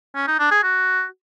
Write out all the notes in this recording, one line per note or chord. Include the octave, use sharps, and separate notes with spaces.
C#4
D#4
D4
G#4
F#4